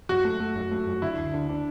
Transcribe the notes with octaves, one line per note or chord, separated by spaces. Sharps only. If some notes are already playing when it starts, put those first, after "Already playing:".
F#2 F#4
A3
A3
F#2
A3
F#2
D3 E4
D2
D4
D4